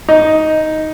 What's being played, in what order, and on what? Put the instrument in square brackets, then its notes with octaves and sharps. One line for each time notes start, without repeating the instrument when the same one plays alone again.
[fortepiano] D#4